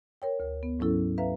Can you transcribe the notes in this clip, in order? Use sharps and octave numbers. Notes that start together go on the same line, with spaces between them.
A#4 C#5 G5
D2 A#4
B3
G#2 F#3 C#4 E4 A4
B4 E5 F5 A#5